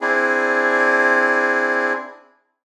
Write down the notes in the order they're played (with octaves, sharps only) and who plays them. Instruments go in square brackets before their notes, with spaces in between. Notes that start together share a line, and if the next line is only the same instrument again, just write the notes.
[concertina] C4 D4 E4 G#4